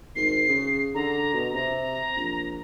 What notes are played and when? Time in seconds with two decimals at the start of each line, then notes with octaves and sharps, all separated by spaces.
0.16 G#1 C7
0.49 C#3
0.95 D3 A#5
1.34 B2
1.53 C3 A#5
2.16 A#1